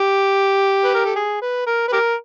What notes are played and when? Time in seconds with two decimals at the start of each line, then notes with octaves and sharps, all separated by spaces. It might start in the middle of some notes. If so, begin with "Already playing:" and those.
Already playing: G4
0.84 B4
0.95 A#4
1.06 A4
1.16 G#4
1.42 B4
1.67 A#4
1.88 B4
1.92 G4 A#4